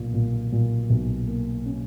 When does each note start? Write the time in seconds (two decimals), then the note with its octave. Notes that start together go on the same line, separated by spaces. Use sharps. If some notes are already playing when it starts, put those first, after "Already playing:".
Already playing: B1 A#2
0.14 A#2
0.52 A#2
0.90 B1
1.28 A#3
1.66 C#4